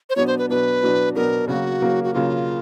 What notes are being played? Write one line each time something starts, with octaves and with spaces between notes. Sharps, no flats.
C5
B2 F#3 B3 D4 C#5
C5
B4
B2 F#3 B3 D4 B4
B2 F#3 B3 D4
B2 F#3 B3 D4 A#4
C#3 F#3 A#3 F#4
C#3 F#3 A#3
F#4
C#3 F#3 A#3 F4